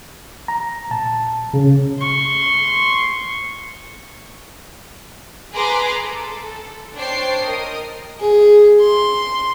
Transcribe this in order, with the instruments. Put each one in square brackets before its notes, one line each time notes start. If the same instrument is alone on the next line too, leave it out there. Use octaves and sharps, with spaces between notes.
[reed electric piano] A#5
A#2 A5
[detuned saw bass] C#3
[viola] C6 C#6
[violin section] G#4 B4 A#5 C6 D6
A4
D4 C5 C#5 G5 A5 C7
A#4 D#5 D#6
[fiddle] G#4
C6